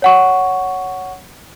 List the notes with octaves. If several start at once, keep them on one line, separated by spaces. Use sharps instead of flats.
C#5 F#5 C#6